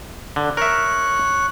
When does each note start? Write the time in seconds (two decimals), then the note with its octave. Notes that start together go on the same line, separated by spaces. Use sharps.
0.36 D3
0.57 A#4 C#5 E5 F#6